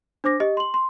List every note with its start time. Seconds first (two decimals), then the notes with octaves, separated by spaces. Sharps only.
0.24 D4 C5 D6 A#6
0.40 G4 D#5
0.57 C6 F#7
0.74 C6